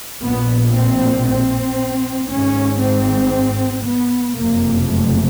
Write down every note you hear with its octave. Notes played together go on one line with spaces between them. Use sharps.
A#1 A#2 B3
C4
C4
G#1 G#2 C#4
C4
B3
F#1 F2 C3 A#3
A3